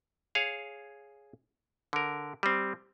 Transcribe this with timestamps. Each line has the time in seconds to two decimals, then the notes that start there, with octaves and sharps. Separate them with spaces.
0.35 G#4 C#5 F5
1.93 D3 A#4
2.43 G3 C4